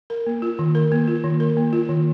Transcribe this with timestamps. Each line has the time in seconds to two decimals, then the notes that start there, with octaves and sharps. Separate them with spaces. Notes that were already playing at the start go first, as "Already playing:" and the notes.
0.10 A#4
0.27 A#3
0.42 F4
0.59 D#3
0.75 A#4
0.92 A#3
1.08 F4
1.24 D#3
1.40 A#4
1.57 A#3
1.73 F4
1.89 D#3